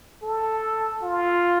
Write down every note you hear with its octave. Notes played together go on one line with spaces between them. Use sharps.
A4
F4